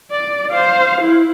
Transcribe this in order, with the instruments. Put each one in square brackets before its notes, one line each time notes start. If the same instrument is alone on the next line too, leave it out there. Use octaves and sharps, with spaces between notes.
[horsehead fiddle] D5
C5 F5
E4